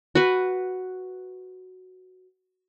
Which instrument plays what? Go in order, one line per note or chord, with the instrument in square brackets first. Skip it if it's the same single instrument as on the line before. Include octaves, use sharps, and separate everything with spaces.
[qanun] F#4 B4